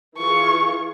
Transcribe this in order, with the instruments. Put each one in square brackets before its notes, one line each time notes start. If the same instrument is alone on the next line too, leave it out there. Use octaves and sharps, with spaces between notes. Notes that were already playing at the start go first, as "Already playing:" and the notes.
[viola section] E3 F4 G#4 [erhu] C#6